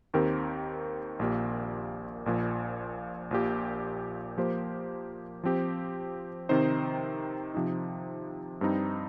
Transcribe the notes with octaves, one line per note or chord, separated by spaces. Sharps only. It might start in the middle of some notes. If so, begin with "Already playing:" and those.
D#2 D#3 C4 G4 A#4
A#1 A#2 A#3 G4
A#1 A#2 F3
A#1 A#2 A#3 G4
F3 A#3 G4 C5
F3 C4 G4
C3 D#3 C4 D#4 C5
C3 F3 D#4
G2 G3 C4 D#4